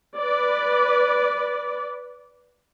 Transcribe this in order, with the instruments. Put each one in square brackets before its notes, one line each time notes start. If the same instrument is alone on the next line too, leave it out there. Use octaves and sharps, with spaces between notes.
[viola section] B4 D5